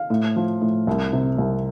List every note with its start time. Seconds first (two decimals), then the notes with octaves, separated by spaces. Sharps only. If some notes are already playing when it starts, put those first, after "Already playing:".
Already playing: F5
0.10 A2
0.36 F3
0.61 A2
0.87 C2
1.13 C3
1.38 C2